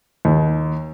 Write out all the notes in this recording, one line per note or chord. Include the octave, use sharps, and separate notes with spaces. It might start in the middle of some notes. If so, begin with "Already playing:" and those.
D#2